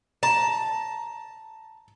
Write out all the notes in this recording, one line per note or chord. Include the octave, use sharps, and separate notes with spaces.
A5 A#5